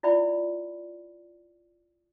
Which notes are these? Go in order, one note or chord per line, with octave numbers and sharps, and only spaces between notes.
E4 F4 D5 E5 G5 B5